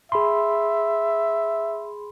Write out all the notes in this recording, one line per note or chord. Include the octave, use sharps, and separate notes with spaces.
G#4 E5 B5 C6